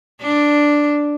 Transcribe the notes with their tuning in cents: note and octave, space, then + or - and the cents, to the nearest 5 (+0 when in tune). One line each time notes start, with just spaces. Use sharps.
D4 +0